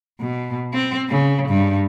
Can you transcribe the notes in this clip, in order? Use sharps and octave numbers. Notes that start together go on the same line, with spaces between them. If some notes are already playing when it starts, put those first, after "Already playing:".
B2
C4
C#3
G2